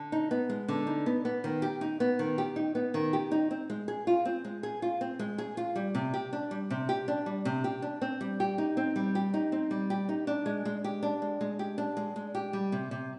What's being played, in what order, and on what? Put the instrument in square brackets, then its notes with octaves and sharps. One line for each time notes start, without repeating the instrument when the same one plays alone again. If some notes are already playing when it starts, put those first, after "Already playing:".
Already playing: [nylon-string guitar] D3
D#4
B3
G#3
D3
D#4
B3
B3
D#3
G4
D#4
B3
D#3
G4
D#4
B3
D#3
G4
D#4
C4
G#3
G#4
F4
C4
G#3
G#4
F4
C4
G#3
G#4
F4
G3
C3
G4
D4
G3
C3
G4
D4
G3
C3
G4
D4
C4
G3
G4
D#4
C4
G3
G4
D#4
C4
G3
G4
D#4
D4
G#3
G#3
G4
D4
G#3
G#3
G4
D4
G#3
G#3
G4
G3
C3
C3